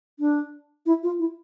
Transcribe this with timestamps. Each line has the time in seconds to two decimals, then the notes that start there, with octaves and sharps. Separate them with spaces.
0.19 D4
0.86 E4
1.03 F4
1.19 E4